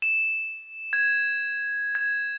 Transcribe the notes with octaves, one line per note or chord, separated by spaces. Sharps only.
E7
G#6
G#6